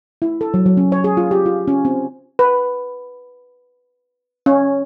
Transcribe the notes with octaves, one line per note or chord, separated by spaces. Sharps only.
E4
A4
F#3
F#3
C#4
C#5
G#4
F4
G4
F4
C#4
C4
B4
C#4